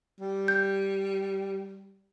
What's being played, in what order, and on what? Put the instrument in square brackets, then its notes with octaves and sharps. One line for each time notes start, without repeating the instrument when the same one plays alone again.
[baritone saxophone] G3
[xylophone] G6